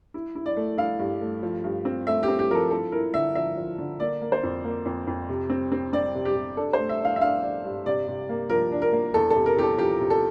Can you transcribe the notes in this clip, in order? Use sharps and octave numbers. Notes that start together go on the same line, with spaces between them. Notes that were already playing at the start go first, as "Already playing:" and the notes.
E4
E4
D5
A3
E4 F5
G2
A3
F3
G2
C4
A3 E5
G4
C4
G4
F3 A4 A#4
E4 A4
E4 A#4
D3 E5
F3 E5
F3
D3
A#3 D5
A#3
C5
F2
A#3
F2
F2
C3
C4
C4
C4 D5
C3
G4
C3
D4 A4
C5
A3
E5
D4 F5
E5
D4 F5
D4
G2
C3 D5
C3
A#3
F3 A#4
D4
A#4
A#3
E2 A4
A4
C3
A#4
E2 G4
A4
F3 G4
C3
A4